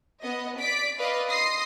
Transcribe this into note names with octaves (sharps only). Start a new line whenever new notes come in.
B3 D#5
D5 B6 D7
B4 D5 D#5 F5
C6 D#6 A#6 C7